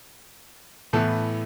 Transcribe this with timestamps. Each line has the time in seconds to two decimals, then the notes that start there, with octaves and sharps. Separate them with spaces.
0.93 A2 E3 B3 E4 A4